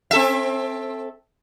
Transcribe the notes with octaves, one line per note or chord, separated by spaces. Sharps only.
C4 A4 E5